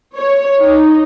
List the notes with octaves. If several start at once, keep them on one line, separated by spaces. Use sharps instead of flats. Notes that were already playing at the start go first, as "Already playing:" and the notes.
C#5
D#4